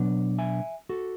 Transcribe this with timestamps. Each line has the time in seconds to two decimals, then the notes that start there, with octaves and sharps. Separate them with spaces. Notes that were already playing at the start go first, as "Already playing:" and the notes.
Already playing: B2 F#3 B3 D4
0.38 E5 G#5
0.89 F#4 A4